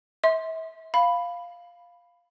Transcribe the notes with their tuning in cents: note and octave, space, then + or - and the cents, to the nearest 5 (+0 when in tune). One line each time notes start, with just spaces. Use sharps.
E5 -35 C6 +0
F5 +0 B5 +0